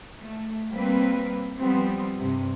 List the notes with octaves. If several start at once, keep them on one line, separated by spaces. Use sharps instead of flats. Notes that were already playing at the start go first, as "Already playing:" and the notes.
A3
G3 A#3 C4 B4
F3 G3 B3 C4
G2 C3